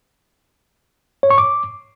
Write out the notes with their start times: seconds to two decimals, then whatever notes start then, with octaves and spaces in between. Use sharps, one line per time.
1.23 C#5
1.31 C#6
1.38 D6